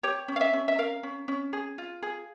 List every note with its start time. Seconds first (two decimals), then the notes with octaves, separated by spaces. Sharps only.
0.03 G4 C#5
0.28 C#4
0.36 F5
0.41 E5
0.53 C#4
0.68 E5
0.78 A#4 F5
1.03 C#4
1.28 C#4
1.53 G#4
1.78 F4
2.02 G#4